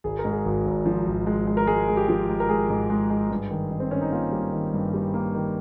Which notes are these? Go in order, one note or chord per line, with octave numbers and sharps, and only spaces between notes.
G#1 G#4
A#4
G#2
G#4
G#1
G#1
F3
G#1
G#3
G#3
A#4
G#3 G#4
G#3
G4
F3 G#4
G#3
A#4
G#3 G#4
G#2
G#3
G#3
G2
D#3
D#3
C4
D#3 C#4
D#4
A#3 F4
G3
D#3
G2
G3
A#3
D#3